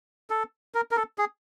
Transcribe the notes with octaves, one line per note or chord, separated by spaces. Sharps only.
A4
A#4
A#4
A4
G#4